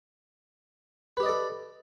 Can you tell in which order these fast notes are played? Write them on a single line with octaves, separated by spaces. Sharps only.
B4 G4 D#5 D5 A4